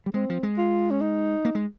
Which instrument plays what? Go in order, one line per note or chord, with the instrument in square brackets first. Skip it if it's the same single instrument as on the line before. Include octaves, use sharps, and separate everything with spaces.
[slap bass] G3
[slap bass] G#3 [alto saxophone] C4
[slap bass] F3
G#3
[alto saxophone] F4
C#4
D#4
[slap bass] A#3
G#3